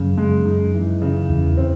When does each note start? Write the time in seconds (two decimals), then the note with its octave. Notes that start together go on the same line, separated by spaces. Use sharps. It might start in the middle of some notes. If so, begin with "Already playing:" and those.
Already playing: F#2 C#3
0.17 G#3
0.45 D#4
0.74 E3
1.02 C#3
1.29 E2 E3
1.57 C4